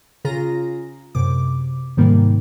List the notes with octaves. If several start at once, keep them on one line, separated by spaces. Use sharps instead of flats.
C#3 F4 G#4 A#5 A#6
F#2 C3 D6
G#2 C3 D#3 G3 A#3